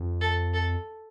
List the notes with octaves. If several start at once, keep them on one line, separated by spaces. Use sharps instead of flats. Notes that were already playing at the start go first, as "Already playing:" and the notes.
Already playing: F2
A4
A4